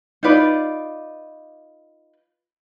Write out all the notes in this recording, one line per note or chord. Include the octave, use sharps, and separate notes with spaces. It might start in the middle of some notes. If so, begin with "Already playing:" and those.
D#4 F4 B4 D5